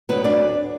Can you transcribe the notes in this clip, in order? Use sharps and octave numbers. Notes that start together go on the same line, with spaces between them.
D2 D3 F#3 B3 B4
D4 D5